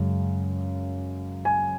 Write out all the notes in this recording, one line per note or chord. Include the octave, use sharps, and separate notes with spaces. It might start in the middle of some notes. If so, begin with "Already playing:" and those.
Already playing: F#2 C#3 G#3
G#5